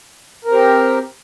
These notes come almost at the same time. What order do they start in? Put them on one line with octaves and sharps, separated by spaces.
A#4 C4 G4